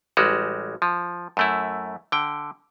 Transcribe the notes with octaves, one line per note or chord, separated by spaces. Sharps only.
A1 G3 G#3 F#4
F3
F#2 A3 E4
D3 G5